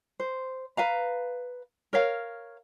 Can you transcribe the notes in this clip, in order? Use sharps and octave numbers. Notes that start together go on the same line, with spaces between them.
C5
B4 F5 A#5
A#4 C#5 F5